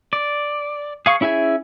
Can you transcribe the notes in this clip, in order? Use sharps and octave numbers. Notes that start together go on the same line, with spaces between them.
D5
G#4 F5 C#6
C#4 E4 G#4 E5 G#5